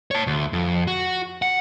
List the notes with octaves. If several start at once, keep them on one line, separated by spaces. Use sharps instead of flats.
C#5 A5
D2
F2
F#4
F#5